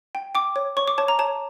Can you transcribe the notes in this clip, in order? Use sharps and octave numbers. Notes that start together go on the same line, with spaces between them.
G5
G5 D6
C#5
C#5 C#6
D6
C#5 A5
A#5
C#5 A5